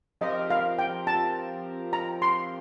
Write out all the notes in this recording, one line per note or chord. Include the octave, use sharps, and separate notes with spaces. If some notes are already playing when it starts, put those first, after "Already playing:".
F3 C4 G4 A#4 D#5
F5
G5
A5
A#5
C6